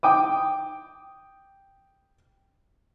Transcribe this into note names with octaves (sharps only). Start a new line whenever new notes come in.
G5 D6 D#6